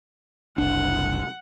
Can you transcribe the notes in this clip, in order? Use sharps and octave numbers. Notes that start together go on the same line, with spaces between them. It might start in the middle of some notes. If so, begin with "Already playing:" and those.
F#1 C2 D4 F#5